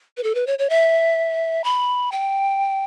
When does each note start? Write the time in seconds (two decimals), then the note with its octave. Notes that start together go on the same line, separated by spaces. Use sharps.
0.17 B4
0.23 A4
0.35 B4
0.47 C#5
0.59 C#5
0.70 E5
1.64 B5
2.12 G5